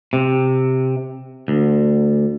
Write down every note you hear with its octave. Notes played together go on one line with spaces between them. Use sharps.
C3
D2